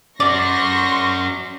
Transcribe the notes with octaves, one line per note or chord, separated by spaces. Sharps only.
C#4 F#4 D5 C6 C#6 A#6